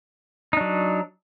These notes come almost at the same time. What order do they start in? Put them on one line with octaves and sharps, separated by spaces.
D#4 D4 F#3